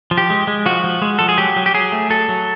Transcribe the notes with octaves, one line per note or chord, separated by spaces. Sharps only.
F3
G4
G#3
G#3
F3 F#4
F3
G#3
F3 A4
G#4
F#3 G4
F#3
G4
F#3 G#4
A3
F#3 A4
F#3